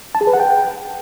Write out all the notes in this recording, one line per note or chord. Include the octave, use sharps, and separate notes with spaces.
A5
G#4
B4
F#5
G5